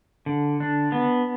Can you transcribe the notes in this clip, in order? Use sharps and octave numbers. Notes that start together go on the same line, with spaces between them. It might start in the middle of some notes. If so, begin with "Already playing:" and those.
D3
D4
B3